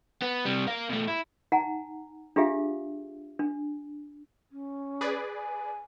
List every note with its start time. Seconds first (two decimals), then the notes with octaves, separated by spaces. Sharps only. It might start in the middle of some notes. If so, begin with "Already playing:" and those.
0.22 B3
0.45 C3 G3
0.67 A#4 F5
0.89 B2 A3
1.07 E4
1.52 D#4 F#5 G#5 A#5
2.36 D4 F4 G4 G#4 E5 F5
3.39 D4
4.52 C#4
5.01 G#4 B4 D5
5.35 G#5